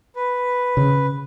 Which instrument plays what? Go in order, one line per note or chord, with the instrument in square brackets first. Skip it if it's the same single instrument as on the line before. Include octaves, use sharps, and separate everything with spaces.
[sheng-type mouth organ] B4
[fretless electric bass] C#3